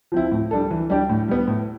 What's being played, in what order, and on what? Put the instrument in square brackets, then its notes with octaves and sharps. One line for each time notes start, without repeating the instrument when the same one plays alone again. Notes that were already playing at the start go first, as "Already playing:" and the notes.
[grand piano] F3 C4 E4
A2
G3 D4 A4
E3
G3 D4 G4 D5
A2
G3 B3
A2